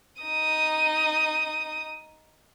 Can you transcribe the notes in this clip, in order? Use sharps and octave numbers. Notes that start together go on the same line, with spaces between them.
D#4 D#6